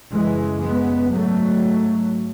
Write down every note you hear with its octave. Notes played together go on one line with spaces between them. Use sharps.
F#2 C#3 E3 G#3
G#3 B3
G#2 F#3 A3